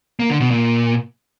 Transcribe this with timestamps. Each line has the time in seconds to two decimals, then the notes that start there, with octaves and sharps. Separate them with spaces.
0.19 A#3
0.30 D3
0.40 B2
0.51 A#2